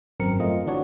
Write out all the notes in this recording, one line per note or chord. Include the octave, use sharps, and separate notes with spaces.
G#1 F#2 C4 A#4 C#7
F#2 A3 C4 F4 D#5
D3 E3 D4 F#4 C#5